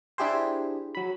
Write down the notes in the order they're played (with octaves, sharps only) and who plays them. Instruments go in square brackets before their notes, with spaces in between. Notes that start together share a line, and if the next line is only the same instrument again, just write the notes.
[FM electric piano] D4 E4 G4 G#4 C5
F#3 B5